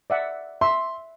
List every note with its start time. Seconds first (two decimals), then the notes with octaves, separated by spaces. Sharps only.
0.10 D5 E5 F#5
0.61 E5 C6